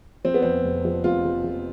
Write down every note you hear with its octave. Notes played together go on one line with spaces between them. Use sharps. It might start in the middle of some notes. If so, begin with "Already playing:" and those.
F3 C4
B3
F2 C4
F1
F3
F1 F4
F3
F3